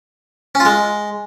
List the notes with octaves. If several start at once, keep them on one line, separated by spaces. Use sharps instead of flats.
C#4
F4
G#3